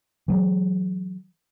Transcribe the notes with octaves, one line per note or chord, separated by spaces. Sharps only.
E3 F#3 G#3